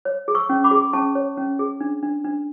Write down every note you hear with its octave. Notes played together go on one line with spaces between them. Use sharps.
C#5
G#4
C#6 E6
C#4
B5 D6
G#4
C#4 A5 C#6
C#5
C#4
G#4
D4
D4
D4